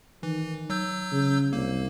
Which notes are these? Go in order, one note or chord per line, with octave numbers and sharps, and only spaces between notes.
D#3 E3
F#3 E6 G6
C#3
C2 A#3